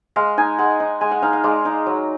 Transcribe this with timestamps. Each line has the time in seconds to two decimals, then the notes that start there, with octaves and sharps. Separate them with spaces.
0.16 G#3 F5
0.37 D#4 G#5
0.59 G#3 F#5
0.80 D#4
1.01 G#3 G#5
1.11 F#5
1.22 D#4 F5
1.33 F5
1.44 G#3 D5
1.65 D#4
1.86 F#3